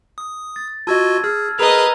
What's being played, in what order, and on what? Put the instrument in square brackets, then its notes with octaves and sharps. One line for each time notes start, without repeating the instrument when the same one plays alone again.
[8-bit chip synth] D#6
[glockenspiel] A6
[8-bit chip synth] F4 F#4 D#5 [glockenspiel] A5 E6 G#6
[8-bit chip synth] G#4 [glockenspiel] F6
[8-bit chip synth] G#4 A#4 [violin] B4 D#5 [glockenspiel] A#5 F7